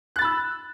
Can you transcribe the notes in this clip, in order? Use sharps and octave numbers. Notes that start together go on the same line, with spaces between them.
B5 E6 F#6 A6